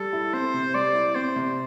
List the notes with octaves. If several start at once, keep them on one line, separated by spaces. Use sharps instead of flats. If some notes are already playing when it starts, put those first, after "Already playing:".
Already playing: G3 A4
E4
C4 C5
C3
G3 D5
E4
C4 C5
C3